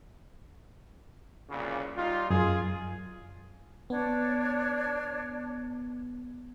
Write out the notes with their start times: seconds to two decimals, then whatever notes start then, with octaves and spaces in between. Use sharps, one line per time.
1.49 C2 A#2 C#3
1.97 G3 D#4 F4
2.30 F#2 F4 G#4
3.90 B3 D4 C#5